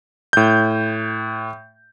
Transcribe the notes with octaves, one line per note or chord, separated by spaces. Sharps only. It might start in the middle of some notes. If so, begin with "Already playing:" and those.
A2 G6